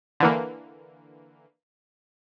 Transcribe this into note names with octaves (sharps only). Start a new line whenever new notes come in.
D3 E3 A#3